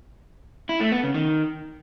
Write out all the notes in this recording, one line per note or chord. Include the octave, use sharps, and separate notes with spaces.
E4
A3
B3
C#3
D#3